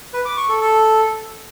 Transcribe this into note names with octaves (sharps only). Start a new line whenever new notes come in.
B4
D6
C#6
A4
A4